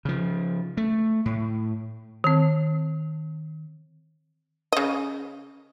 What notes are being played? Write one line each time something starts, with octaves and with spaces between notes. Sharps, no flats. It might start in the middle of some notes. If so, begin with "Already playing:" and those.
C#3 F3
A3
A2
D#3 C4
C#3 D#5